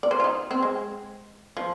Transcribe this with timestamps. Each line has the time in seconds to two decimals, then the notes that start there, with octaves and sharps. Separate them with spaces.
0.03 D5
0.11 C5
0.20 F4
0.24 D#4
0.51 C4
0.62 G#3
1.57 F3